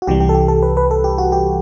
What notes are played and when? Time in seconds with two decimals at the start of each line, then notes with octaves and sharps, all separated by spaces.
0.02 F#4
0.07 C2 C3 E3 G3 G4
0.20 G4
0.29 A4
0.34 G4
0.48 A4
0.62 B4
0.77 B4
0.91 A4
1.04 G4
1.18 F#4
1.32 G4